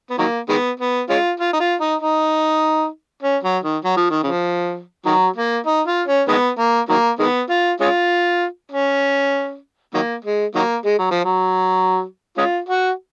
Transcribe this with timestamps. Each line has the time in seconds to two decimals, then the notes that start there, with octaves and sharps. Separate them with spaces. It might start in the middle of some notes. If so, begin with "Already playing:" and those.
0.10 B3
0.18 D#3 F#3 A#3
0.49 D#3 G#3 B3
0.80 B3
1.09 G#3 C#4 F4
1.40 F4
1.53 D#4
1.60 F4
1.80 D#4
2.01 D#4
3.23 C#4
3.43 F#3
3.63 D#3
3.84 F#3
3.96 F3
4.10 D#3
4.23 C#3 F3
5.06 D#3 F#3
5.36 A#3
5.66 D#4
5.87 F4
6.08 C#4
6.28 D#3 G#3 B3
6.59 A#3
6.89 D#3 F#3 A#3
7.19 D#3 G#3 B3
7.50 F4
7.80 G#3 C#4 F4
8.72 C#4
9.94 D#3 F#3 A#3
10.24 G#3
10.55 D#3 F#3 A#3
10.85 G#3
10.98 F#3
11.11 F3
11.24 F#3
12.38 G#3 C#4 F4
12.69 F#4